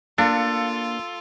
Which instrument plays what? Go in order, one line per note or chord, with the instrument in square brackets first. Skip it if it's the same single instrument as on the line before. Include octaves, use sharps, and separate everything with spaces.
[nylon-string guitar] A#3 [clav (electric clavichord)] D4 [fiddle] F4 [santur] A4